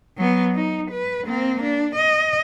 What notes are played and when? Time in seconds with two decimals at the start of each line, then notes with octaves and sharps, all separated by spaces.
0.17 F#3 B3
0.55 D#4
0.91 B4
1.26 A#3 C4
1.63 D4
1.96 D#5